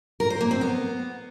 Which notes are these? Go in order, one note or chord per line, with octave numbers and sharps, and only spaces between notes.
A#4
C5
A#3
C4
B3